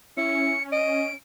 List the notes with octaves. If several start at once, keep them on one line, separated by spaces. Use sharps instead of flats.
C#4 E4 C#7
D#5 D7